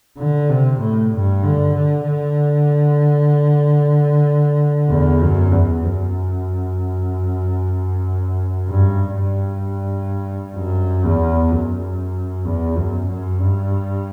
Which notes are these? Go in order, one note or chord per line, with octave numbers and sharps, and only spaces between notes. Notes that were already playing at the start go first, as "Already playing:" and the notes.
D3
C3
A2
G2
D3
D3
D3
E2
F#2
E2
F#2
G2
G2
F#2
E2
F#2
E2
F#2
F#2
G2